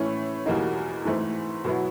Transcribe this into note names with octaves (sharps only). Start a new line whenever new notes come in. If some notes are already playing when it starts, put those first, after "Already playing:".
Already playing: A2 E3 A3 C#4
E2 B2 G3 A#3 D#4
G#2 E3 A3 C4
B2 F#3 B3 E4